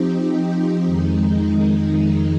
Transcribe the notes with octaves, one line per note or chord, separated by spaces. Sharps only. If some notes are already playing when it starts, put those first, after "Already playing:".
Already playing: F3 C4 D#4 G4
F2 D#3 G#3 D#4